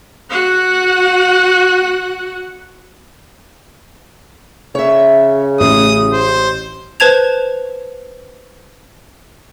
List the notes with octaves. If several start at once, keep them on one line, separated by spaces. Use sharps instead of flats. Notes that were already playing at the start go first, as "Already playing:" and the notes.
F#4 F#5
C#3 C#5 E5
A1 A2 G#4 D#6
C5
B4 C5 A5 G#6 F7